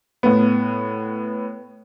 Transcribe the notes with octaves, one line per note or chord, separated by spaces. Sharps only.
A2 B3